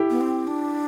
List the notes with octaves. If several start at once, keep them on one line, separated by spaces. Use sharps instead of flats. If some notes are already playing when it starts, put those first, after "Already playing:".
Already playing: E4 G4
B3
C4
D4